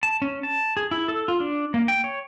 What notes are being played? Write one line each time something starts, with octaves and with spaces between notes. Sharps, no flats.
A5
C#4
A5
G#4
E4
A4
F4
D4
A#3
G5
C#5